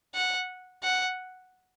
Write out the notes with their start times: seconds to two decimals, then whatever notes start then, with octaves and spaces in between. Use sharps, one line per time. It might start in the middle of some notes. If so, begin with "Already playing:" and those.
0.15 F#5
0.83 F#5